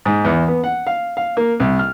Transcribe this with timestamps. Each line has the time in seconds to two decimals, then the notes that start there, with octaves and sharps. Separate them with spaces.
0.05 G#2
0.25 E2
0.48 B3
0.64 F#5
0.87 F5
1.17 F5
1.37 A#3
1.60 C2
1.79 F6